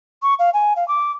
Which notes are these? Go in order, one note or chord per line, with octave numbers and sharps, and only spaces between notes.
C#6
F5
G#5
F5
D6